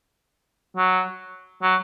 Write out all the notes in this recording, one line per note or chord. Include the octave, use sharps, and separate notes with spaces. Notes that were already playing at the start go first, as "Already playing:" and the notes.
F#3
F#3